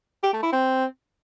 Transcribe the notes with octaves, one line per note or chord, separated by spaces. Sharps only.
G4
A3
E4
C4